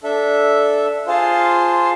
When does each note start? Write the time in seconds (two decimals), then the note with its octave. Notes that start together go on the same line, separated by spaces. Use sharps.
0.03 D4 A4 E5
1.07 F4 G#4 C5 F5 A5